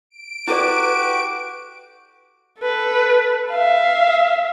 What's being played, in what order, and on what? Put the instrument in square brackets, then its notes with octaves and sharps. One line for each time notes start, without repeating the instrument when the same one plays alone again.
[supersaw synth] D7
[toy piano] E4 A4 D5 [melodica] F#4 G4 [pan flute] B4
[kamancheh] A4 B4
E5 F5